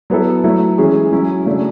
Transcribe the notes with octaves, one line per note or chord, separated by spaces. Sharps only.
F#3 B3 E4 A4
F#3 A3 E4
E3 G#3 C#4 G#4
F#3 C#4 E4
C#3 F#3 A3 D4